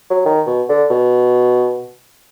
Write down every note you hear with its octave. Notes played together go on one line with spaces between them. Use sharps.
F#3
D#3
B2
D3
B2